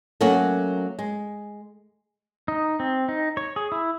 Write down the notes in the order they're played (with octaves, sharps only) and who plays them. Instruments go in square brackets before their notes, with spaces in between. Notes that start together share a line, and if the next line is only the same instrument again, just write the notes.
[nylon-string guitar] F#3 A3 A#3 C#4 F#4
G#3
[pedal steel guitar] D#4
C4
D#4
C#5
G#4
E4